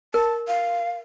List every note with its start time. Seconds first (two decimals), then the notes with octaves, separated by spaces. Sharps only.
0.14 A#4 A5
0.48 F5